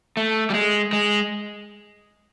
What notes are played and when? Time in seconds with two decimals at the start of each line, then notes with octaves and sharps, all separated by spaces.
0.17 A3
0.50 G3
0.54 G#3
0.93 G#3